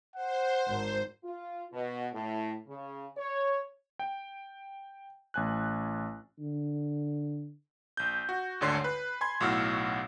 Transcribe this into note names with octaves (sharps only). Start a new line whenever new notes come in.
C5 F#5
G#1 G#2
F4
B2
A2
C#3
C#5
G5
A1 G#5 F#6
D3
A#1 G6
F#4
G#1 D2 D3 C#5 C6 C7
B4
G#5 B5 C6 G#6
B1 A2 F#4 E6 F6